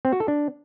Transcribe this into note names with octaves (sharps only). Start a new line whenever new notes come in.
C4
F#4
A4
D4